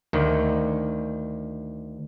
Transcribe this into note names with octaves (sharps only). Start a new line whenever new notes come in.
D2 D#3